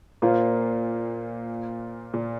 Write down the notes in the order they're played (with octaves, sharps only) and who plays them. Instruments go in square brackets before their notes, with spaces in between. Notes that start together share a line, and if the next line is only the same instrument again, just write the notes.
[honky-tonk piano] A#2 [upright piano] A#3 F4 C5
[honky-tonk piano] A#2